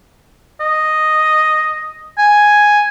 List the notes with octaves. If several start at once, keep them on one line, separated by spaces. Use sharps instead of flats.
D#5
G#5